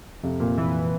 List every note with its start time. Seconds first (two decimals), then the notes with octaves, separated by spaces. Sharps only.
0.23 F2 C3
0.40 A#2
0.57 A#2 E3